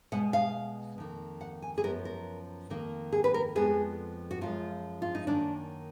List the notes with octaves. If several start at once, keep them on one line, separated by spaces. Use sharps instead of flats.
B2 G#3 B3 F#5
F5
F2 D#3 A#3
F#5
G#5
G#4
F#2 F3 B3 A#4
A#4
F2 D#3 A#3
G#4
B4
A#4
F2 F3 G#3 B3 G#4
F#4
F#2 F3 G#3 F4
F4
D#4
F#2 D#3 A#3 D4